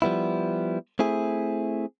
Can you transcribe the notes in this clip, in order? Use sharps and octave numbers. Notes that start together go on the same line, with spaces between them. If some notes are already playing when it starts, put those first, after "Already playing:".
F3 G3 B3 E4
A3 C4 E4 G#4